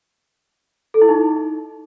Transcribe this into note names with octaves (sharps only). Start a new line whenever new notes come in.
A4
E4
D#4